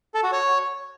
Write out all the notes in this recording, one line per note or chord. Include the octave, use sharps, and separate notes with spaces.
A4
F#4
C#5